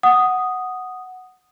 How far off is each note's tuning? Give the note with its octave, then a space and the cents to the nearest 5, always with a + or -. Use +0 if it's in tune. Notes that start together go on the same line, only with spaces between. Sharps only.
F#5 +0 D#6 +0